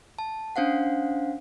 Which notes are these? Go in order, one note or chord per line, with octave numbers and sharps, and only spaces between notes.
A5
C#4 D4 C5 F5 F#5